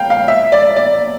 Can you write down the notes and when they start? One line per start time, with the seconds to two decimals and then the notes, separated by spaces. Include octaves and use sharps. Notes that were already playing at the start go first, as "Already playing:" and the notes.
Already playing: F5 G5
0.10 F5
0.28 E5
0.52 D5
0.76 D5